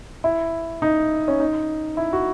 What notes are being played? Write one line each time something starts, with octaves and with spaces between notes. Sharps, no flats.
E4
D#4
C#4
D#4
E4
F#4